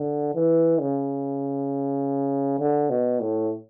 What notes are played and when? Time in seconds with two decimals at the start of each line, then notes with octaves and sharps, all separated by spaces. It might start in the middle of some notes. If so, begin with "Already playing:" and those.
Already playing: D3
0.35 E3
0.80 C#3
2.59 D3
2.90 B2
3.20 A2